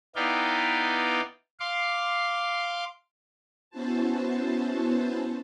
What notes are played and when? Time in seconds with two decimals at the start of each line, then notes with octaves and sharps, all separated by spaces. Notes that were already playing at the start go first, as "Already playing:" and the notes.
0.16 B3 D#4 E4 D5 F5 G5
1.60 F5 C6 D6
3.70 B3 C#4 E4 F#4 C5 A5